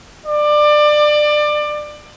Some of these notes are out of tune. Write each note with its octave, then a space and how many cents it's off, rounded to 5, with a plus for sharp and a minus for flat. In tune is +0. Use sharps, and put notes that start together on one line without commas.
D5 +25